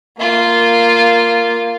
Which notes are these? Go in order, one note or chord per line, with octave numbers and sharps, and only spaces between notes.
A#3 F4